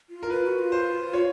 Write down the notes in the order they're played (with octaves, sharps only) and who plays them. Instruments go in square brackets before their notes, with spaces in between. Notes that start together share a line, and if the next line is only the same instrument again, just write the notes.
[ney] F4
[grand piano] A#4
[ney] F4 [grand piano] B4
[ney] F#4
F4
[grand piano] C5
C#5